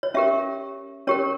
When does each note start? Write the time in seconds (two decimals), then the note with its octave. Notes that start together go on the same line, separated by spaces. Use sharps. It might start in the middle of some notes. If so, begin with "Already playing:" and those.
0.03 C#5
0.14 C#4 G4 A#4 E5
1.07 C#4 G4 A#4 C#5